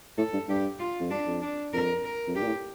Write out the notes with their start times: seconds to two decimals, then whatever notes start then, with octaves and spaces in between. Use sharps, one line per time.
0.18 A2 A4
0.33 G2
0.49 G2 G4
0.79 F4
1.00 F2
1.11 G2 D4
1.26 F2
1.42 D4
1.73 F2 A#4
2.04 A#4
2.27 F2
2.36 G2 G4
2.42 A#2
2.46 A2